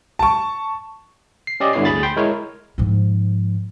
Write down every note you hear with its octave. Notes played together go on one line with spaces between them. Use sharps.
A5 C#6
C7
C#4 G4 D5 D#5
G2 D3 B3 E4 C#5 C7
D2 G#4 B5 A6
G5 C6
G#3 E4 A#4 C#5
G#2 F3